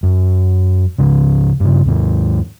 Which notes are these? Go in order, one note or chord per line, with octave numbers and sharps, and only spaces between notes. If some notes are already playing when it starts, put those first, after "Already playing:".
F#2
C#2 G#2 C#3
G2 C#3
D#2 G#2 D#3